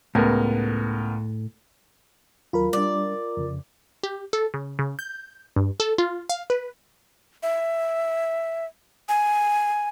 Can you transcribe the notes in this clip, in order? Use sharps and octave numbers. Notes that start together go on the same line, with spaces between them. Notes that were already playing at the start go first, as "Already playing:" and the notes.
C#2 A2 B3 A#4
D#2 F#3 F4 A#4 B5
G3 D4 D5
F2 C#3
G4
A4
C#3
C#3
G6
G2
A4
F4
F5
B4
E5
G#5